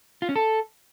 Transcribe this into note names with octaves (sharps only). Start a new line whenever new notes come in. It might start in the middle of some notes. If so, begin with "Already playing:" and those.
F4
C#4
A4